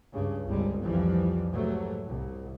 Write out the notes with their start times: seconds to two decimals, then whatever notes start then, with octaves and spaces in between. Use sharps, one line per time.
0.13 C#2 G2 C#3
0.47 G1 C#2 C3 G3 G#3
0.83 C2 F2 E3 F3 G3
1.51 G#2 C3 E3 F#3 A3
2.09 C2